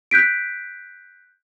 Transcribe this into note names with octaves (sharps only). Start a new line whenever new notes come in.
F#6 G6 B6 D7